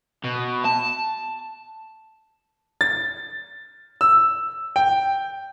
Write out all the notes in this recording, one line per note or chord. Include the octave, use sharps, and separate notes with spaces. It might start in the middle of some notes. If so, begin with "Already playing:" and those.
B2
A5
A6
E6
G5